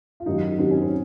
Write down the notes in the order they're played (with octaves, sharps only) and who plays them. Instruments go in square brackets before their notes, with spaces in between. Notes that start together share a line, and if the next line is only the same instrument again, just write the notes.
[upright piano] F4
F#2 D#3 F#3 D#4
F#2 D#3 F#3 C4
C#4
C4